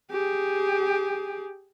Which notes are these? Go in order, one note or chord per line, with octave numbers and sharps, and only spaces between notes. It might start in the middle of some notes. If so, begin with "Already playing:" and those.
G4 G#4